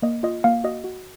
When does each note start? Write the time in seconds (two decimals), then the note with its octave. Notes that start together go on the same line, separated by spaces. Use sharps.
0.02 A#3 D#5
0.23 F4 D#5
0.44 A#3 F5
0.64 F#4 D#5
0.84 F#4